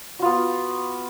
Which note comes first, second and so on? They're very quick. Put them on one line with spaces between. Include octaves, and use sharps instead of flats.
F#4 F4 B3